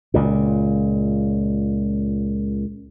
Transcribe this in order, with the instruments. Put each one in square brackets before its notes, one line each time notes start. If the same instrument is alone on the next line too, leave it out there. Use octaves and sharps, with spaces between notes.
[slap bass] C#2 A#2